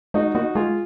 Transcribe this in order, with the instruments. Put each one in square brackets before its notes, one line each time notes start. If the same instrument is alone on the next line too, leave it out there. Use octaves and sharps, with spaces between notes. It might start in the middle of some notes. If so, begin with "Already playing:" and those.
[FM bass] G#3 [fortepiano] D#4 F#4
[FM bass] A#3 [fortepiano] D#4 F#4
[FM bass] G#3 [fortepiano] F4 G#4